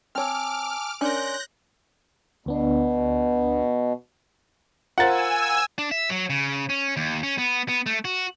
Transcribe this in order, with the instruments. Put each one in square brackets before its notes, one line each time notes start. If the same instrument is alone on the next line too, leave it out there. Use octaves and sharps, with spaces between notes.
[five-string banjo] C4 C#5 [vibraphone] G#5 A5 E6 [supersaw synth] D6 F6
[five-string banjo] C#4 D4 A#4 [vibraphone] C#5 C6 [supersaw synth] F#6 G6 A#6
[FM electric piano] D2 B3 D4 [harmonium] B2
[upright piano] F4 A#4 C5 [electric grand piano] F#5 A6 [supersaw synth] G#5 E6
[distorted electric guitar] D4
E5
F#3
C#3
C#4
D#2
C#4
B3
B3
A3
F#4